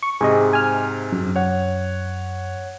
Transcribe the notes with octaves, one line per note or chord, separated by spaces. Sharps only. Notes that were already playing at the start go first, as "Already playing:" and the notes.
C#6
G#2 C3 G#4 D#5
G#5 F6
F#2
C#5 F#5